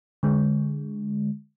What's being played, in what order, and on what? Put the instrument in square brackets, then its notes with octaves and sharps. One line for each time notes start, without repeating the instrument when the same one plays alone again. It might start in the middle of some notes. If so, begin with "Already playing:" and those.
[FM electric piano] D3 G#3